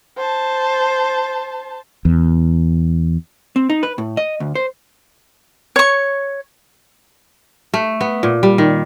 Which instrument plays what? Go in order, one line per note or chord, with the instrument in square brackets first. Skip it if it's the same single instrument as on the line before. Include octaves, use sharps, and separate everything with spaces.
[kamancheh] C5 A5
[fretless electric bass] E2
[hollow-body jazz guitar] C4
D#4
B4
A2
D#5
D2
C5
[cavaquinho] C#5 C#6
[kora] A3
B3
A#2
G3
D#3